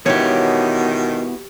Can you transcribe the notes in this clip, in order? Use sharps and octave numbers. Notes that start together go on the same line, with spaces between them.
B2 D#3 B3 E4 F#4 G4 C#5